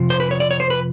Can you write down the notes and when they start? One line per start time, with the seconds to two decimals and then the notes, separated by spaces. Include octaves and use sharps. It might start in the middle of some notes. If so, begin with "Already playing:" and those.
Already playing: F2 C3 F3
0.10 C5
0.20 B4
0.31 C#5
0.40 D5
0.51 C#5
0.60 C5
0.70 B4